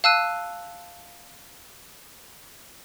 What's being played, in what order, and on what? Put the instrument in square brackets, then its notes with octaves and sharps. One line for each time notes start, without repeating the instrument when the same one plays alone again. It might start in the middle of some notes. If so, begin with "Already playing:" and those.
[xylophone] F5 A5 E6 F#6 D#7